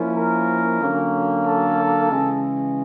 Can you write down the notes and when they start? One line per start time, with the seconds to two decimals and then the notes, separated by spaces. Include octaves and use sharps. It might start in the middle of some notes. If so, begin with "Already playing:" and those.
Already playing: F3 A#3 C#4 E4
0.17 A#4
0.82 D3 F#3 A#3 C#4
1.46 A4
2.10 C#3 E3 G#3